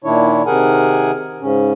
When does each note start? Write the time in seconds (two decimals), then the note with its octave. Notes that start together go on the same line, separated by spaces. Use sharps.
0.04 A#2 D#3 D4 E4 C#5
0.46 C3 D#3 G#4 A#4 F#5 G#5
1.41 G#2 C#3 C#4